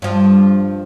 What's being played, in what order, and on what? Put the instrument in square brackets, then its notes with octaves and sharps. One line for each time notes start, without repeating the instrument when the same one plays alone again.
[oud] G2 F3